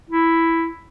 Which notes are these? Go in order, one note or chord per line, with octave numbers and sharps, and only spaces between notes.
E4